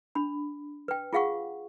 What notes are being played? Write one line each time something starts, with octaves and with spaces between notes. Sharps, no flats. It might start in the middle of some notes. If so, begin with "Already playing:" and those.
D4 B5
B4 G5
F4 G#4 F5 F#5 C#6